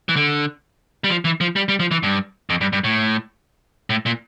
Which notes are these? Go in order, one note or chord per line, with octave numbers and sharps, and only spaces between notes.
E3
D3
G3
F3
E3
F3
G3
G3
F3
E3
G2
F2
G2
G2
A2
A2
A#2